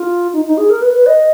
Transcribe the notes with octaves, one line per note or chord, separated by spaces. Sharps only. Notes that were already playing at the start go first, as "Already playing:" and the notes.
Already playing: F4
D#4
D#4
G#4
A#4
B4
B4
D#5